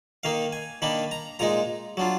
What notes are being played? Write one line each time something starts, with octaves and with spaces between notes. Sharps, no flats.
D#3 A#3 D#4 F5
G#5
D#3 A#3 D4 B5
A#5
A#2 G#3 D#4 A#5
F#3 D4 F4